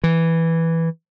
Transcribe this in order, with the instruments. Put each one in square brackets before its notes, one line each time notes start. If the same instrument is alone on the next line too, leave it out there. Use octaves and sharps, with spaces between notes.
[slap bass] E3